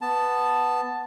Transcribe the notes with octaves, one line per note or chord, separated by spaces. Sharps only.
B3 A5